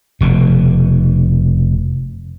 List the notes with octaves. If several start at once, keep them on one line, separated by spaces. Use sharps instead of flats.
F1 B2